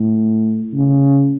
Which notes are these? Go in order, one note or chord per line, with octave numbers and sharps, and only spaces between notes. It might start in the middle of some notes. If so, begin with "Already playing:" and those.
Already playing: A2
C#3